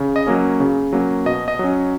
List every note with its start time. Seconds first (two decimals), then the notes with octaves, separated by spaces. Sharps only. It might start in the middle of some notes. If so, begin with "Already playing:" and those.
Already playing: C#3
0.16 D#5
0.27 F#3 A#3 C#4
0.60 C#3
0.93 F#3 A#3 C#4
1.26 B2 D#5
1.48 D#5
1.59 F#3 C#4